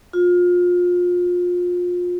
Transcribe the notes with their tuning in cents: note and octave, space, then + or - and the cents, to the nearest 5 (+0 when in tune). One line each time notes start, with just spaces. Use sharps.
F4 +30